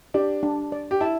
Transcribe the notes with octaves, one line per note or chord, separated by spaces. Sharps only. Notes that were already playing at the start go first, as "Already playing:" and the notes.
D4 G4
D4
D5
G4
E4 A5